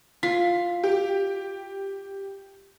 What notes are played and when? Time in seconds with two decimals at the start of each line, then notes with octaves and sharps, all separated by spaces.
0.23 F4 B6
0.84 G4